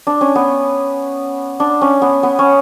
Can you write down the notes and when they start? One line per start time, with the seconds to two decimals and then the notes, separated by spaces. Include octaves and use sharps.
0.07 D4
0.21 C#4
0.35 B3
1.60 D4
1.81 C#4
2.02 B3
2.23 B3
2.39 C#4